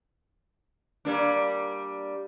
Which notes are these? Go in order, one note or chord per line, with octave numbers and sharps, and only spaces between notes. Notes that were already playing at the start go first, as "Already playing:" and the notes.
G3 A#3 D4